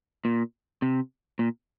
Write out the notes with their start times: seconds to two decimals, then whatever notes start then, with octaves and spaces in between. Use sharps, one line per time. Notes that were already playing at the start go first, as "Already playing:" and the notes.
0.25 A#2
0.82 C3
1.39 A#2